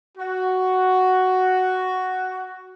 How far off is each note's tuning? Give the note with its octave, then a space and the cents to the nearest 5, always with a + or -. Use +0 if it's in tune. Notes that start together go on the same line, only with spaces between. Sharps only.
F#4 +5